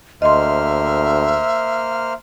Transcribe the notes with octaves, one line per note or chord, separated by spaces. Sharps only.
D2 A#3 C5 D#5 E5 C6 F6